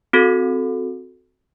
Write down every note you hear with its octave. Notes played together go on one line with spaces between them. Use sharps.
C4 F#4 A4